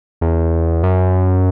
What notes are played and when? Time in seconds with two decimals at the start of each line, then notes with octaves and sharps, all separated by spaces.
0.21 E2
0.83 F#2